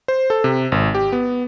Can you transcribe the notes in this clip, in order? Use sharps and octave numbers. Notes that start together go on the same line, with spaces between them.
C5
A4
C3
G#1
G4
B3